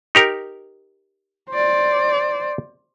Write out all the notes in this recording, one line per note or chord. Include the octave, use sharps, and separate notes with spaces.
D#4 G4 A#4
C5 D5